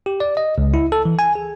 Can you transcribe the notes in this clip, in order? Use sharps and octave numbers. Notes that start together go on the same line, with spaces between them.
G4
D5
D#5
C#2
E4
A4
E3
G#5
G#4